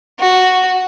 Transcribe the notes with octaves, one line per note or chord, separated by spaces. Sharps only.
F#4